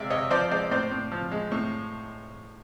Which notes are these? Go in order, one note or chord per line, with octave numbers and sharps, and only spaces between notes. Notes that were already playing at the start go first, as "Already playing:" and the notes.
Already playing: C3 G#3 D5 E5 F5
C3 C#5 D#5
F3 C5 D5
G#3 C5 D5
A2 C5 D5
A2
F3
G#3
A2